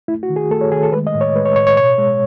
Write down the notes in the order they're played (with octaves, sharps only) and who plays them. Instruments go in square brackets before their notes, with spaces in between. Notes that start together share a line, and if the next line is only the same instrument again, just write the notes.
[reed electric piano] A3 E4
F#4
D#3
G#4
A3 A4
C#5
D#3 G#4
A4
G#3 B4
D#5
A2
C#5
G#3 B4
C#5
A2 C#5
C#5
B2 C#5
G#3